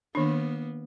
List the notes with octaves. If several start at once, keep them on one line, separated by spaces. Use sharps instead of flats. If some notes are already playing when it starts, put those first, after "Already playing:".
D#3 A#3 B3 D4